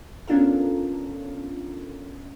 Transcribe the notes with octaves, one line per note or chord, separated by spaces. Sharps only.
B3 C#4 D4 F4 A4 A#4